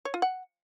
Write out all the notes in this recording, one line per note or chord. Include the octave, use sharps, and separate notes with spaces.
C#5
F4
F#5